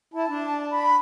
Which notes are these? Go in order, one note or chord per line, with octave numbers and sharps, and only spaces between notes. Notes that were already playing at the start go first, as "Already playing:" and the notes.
E4 A5
D4
B5